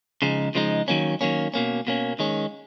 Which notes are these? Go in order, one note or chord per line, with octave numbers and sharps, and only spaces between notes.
C#3 F3 G#3 D#4
C#3 F3 G#3 D#4
D#3 F#3 A#3 C#4
D#3 F#3 A#3 C#4
B2 A#3 C#4
B2 A#3 C#4
D#3 G#3 C#4